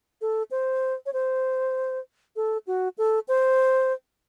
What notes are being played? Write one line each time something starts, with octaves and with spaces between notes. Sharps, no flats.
A4
C5
C#5
C5
A4
F#4
A4
C5